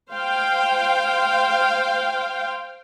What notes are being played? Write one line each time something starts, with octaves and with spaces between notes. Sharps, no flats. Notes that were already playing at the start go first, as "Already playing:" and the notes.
C5 F5 G5